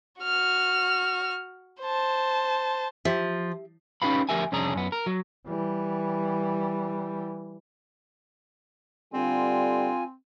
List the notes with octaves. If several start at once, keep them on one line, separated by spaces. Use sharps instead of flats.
F#4 F6
C5 A5
F3 G4 E5
C#4 D#4 G4 B4 F5 B5
D2 F3 G4 A#4 E5 G#5
C2 F2 C#4 D4 G#4 A#5
F#2 B3
A#4
F#3
E3 G3
D3 G3 C4 F4 G#5